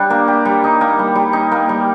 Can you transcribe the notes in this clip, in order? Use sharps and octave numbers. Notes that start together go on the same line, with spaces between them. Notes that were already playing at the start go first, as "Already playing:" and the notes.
Already playing: G3 D4 G4
A#3
G4
G3
D#4
A#3
G3
G3
D#4
A#3
G3